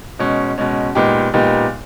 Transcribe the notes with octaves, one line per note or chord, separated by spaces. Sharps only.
B2 G#3 C#4
B2 G#3 C#4
A#2 G#3 B3 D#4 G4
A#2 G#3 B3 D#4 G4